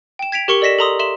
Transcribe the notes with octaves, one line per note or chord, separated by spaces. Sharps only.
G5 E7
G#6 B6 D7 F7
G4 A#4 C#6 C#7 F#7 G7
A4 D5 D#5 A#6 B6 E7
A4 A#4 A#5 C6 D#6
E5 C6 E7 F#7